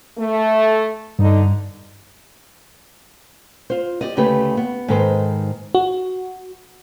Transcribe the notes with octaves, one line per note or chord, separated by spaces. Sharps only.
A3
G2 D3 D#4
F4 C5
G4 D5 D#5
D2 C#3 A3 G4 B4
B3
G#2 D#3 A4 B4 C5
F#4